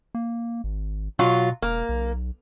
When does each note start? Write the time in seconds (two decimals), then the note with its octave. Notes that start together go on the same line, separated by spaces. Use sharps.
0.15 A#3
0.64 G#1
1.19 B2 F#3 F4
1.62 E1 A#3
1.89 B1